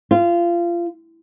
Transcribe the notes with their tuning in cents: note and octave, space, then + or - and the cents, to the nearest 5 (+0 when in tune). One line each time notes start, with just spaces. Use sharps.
F4 -25